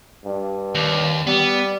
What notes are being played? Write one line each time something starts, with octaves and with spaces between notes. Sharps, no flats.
G2
D#2
G3 B3